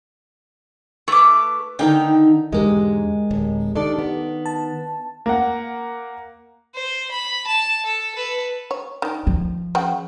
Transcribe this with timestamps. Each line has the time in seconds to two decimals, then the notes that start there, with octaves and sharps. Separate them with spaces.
1.08 A3 B4 D6
1.79 D3 D#3 D#4 G5
2.53 E2 G#2 D3 G#3 G4 A#4 D#5
3.31 D1
3.75 D#3 D4 A4 D5
3.98 B3
4.46 A5
5.26 A#3 F#5
6.75 C5
7.11 B5
7.47 A5
7.86 A4
8.15 A4 B4
8.71 C#5
9.02 D#3 D4
9.27 F3
9.75 C#3 F#4 G5